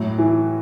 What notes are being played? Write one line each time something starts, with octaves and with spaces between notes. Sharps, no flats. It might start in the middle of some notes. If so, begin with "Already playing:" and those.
Already playing: A2 F#3
E3